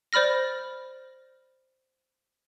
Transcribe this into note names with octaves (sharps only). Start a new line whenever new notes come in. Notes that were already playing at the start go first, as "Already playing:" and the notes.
C5 D5 B5 F6 A#6